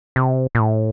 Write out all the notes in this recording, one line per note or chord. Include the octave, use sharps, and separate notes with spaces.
C3
A#2
A2